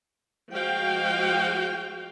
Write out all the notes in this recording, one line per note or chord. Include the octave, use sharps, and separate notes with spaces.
F3 G#3 F#4 F5 G5